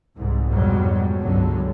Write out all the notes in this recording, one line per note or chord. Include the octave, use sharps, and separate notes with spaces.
C2 G#2
F2 G#2 B2 F#3 G3
G1 C#2 G2 D3 F#3